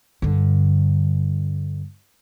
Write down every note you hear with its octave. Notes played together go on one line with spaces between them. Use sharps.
G2 D3